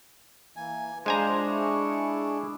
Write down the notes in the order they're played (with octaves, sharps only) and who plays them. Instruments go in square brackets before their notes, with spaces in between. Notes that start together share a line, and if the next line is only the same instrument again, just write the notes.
[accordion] E3 A#3 [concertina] G#5
[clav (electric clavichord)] G#3 G#5 A#5 [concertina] D4 [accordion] F4 [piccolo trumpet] C5
[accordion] E4 G#4 [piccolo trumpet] C#6